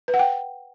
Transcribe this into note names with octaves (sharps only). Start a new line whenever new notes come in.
B4
F#5
G5